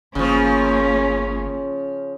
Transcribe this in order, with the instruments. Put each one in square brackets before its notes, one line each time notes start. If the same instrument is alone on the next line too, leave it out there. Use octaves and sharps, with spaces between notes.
[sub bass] G1 [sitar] C#3 F3 [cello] A#3 C#4